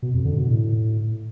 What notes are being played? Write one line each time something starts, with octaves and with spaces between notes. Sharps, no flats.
B2
F2
D3
B2
A2